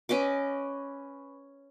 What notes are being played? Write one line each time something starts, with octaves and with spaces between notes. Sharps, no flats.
C#4 B4 D#5 D6